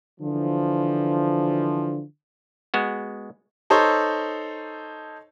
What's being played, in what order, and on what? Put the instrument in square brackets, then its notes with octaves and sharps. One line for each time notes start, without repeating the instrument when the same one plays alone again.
[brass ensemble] D3 E3 F3
[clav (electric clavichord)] G#3 B3 F#4
[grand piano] D#4 A4 C5 C#5